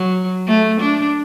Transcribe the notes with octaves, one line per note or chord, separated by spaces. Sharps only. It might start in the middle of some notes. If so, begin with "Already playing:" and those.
Already playing: F#3
A3
D4